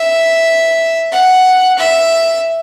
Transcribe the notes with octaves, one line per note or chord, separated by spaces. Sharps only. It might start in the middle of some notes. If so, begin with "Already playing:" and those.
Already playing: E5
F#5
E5